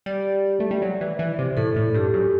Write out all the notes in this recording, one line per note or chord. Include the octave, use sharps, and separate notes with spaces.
G3 D5
A3
G3
F#3
E3
E3
C3
A2 A4
A2
G2 G4
F#2